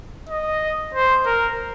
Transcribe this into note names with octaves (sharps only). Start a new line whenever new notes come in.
D#5
C5
A#4